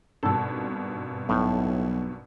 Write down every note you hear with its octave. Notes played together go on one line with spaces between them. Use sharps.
G#1 G2 B2 A4 A5
B1 A2